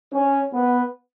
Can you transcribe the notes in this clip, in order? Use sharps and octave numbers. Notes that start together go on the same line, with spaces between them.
C#4
B3